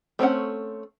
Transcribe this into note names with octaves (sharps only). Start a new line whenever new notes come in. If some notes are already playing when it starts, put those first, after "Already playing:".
A3 C4 C#4 F#5